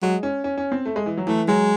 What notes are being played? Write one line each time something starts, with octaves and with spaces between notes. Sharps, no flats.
F#3 G#3
C#4
C#4
C#4
C4
A3
G#3
E3
F#3
E3 A3
F#3 G#3